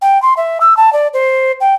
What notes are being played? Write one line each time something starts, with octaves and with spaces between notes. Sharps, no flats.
G5
C6
E5
E6
A5
D5
C5
G5